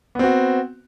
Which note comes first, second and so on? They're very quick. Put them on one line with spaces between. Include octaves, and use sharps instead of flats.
B3 C4 F#4